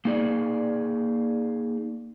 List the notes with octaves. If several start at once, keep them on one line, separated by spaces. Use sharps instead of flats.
A#3 D#4 G#4 D5